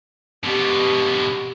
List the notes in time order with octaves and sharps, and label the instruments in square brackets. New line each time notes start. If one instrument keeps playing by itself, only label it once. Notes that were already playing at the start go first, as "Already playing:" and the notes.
[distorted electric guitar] B2 D3 [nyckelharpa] G4